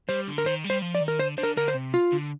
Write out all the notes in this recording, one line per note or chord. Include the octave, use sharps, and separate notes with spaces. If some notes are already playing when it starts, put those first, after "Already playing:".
G3 C5
D3
A#4
D#3 C5
G3
C5
F3
D5
D#3
A#4
D3 C5
D3 C5
A#4
D3 A#4
C5
C3
F4
D3